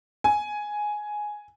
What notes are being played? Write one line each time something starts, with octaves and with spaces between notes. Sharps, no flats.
G#5